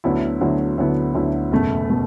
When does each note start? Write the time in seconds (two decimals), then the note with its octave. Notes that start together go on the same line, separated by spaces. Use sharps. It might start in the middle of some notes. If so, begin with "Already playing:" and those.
0.04 D2 D3 F#3 B3 E4
0.41 D2 D3 F#3 B3 E4
0.77 D2 D3 F#3 B3 E4
1.15 D2 D3 F#3 B3 E4
1.51 F#1 E2 B2 A3
1.90 B2 A3